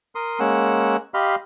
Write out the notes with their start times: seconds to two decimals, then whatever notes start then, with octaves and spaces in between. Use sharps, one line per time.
0.15 A#4 C6 D#6
0.40 G#3 A#3 C#4 F#5 E6
1.14 G4 D#5 F5 B5 C6 F6